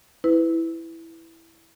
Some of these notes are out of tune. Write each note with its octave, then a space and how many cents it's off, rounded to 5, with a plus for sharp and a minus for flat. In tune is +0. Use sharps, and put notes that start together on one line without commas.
E4 +0 B4 +20